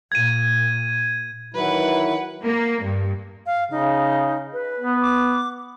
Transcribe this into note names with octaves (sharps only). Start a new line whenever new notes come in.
A#2 G#6 D#7
D#3 E3 F#3 E4 B4 F#5
A#3
G2
F5
C#3 D#4
B4
B3
D6